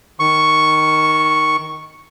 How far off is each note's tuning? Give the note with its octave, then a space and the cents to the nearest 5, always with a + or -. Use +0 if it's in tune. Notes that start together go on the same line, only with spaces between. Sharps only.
D#3 +0 C#6 +0